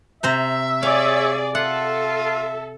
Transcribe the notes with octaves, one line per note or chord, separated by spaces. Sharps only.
C3 C5 E5 A#5
G#4 C#5 D5 F5
F4 A4 E5 F#5